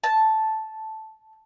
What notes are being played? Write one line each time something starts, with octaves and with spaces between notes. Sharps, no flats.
A5